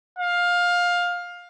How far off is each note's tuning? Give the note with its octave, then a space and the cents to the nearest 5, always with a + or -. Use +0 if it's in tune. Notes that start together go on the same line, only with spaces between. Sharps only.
F5 +15